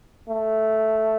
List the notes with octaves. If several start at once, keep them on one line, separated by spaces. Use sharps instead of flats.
A3